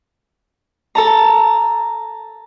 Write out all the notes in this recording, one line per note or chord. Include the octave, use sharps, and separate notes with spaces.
A4 A5 A#5